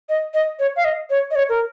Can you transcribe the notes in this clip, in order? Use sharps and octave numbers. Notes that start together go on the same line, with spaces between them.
D#5
D#5
C#5
F5
D#5
C#5
D#5
C#5
A#4